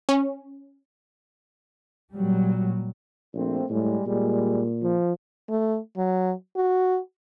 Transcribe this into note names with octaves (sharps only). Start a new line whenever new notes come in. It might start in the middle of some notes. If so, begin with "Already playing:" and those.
C#4
A#2 F#3 G3
A#1 A3 A#3 C4
A2 G3 G#3
A#2 G3 G#3
F3
A3
F#3
F#4